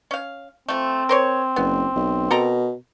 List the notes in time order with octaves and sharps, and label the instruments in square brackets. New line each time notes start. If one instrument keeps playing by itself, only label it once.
[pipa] C#4 F5
[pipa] F3 A3 [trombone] C4
[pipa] A#4 C5 C#5
[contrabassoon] F#1 [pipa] B3
[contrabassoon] B1
[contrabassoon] B2 [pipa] A4 A#4 A#5